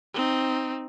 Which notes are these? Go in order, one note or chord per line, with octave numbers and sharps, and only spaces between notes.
C4 D#4